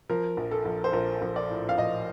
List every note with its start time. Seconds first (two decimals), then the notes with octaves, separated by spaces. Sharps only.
0.09 F3 A#4
0.37 A#1
0.51 A4
0.65 A#1
0.84 C5
0.93 A#1 A#4
1.22 A#1
1.36 D5
1.50 A2
1.69 F5
1.78 A#1 D#5